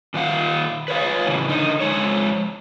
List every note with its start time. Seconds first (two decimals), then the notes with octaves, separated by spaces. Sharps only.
0.14 A#2 D#3 F5 F#5
0.88 B4 C#5 F5
1.27 A2 C#3 E3
1.49 D3 D#4
1.80 F2 G#3 C#5